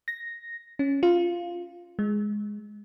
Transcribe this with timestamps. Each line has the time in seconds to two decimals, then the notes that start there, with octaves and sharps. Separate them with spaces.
0.08 A#6
0.79 C#4
1.03 F4
1.99 G#3